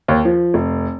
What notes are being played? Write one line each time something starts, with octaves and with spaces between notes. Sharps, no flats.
D#2
F3
F1